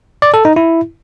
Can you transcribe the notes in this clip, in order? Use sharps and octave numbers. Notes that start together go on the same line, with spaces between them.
D5
A4
D#4
E4